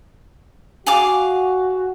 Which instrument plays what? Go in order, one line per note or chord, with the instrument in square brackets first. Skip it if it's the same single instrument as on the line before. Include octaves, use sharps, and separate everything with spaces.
[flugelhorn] F#4 [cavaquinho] G#4 F5 D6